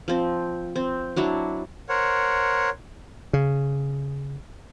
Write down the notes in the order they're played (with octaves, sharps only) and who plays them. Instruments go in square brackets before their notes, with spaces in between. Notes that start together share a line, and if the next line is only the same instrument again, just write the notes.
[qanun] F3 C4
C4
F#3 D4 E4
[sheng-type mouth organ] A#4 C5 C#5 F#5
[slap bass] C#3